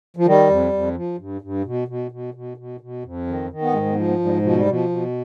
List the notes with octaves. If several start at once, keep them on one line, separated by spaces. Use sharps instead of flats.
F3
D#3 G3
F2
F2
F3
G2
G2
B2
B2
B2
B2
B2
B2
F2
D#3
D#3
B3
G#2 G#3
G#3
B3
F3
B3
G#2
G3
B2 F3
G3
B2
F3
B2